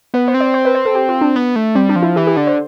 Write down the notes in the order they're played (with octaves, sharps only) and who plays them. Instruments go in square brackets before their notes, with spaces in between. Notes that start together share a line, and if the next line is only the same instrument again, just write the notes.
[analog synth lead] B3 [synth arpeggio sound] B4
[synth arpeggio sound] C5
[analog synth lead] C4
[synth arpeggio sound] D5
C5
B4
C5
A4
G4
F4
D4
[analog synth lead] B3
A3
[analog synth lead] G3 [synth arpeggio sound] C4
[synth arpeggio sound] D4
[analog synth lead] F3
[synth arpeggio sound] E4
[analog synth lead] E3 [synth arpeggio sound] G4
[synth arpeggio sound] G4
[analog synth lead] D3 [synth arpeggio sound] D5
[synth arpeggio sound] C5